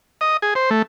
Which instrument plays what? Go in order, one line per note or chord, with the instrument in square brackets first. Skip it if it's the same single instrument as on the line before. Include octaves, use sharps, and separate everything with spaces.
[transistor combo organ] D#5
G#4
C5
A3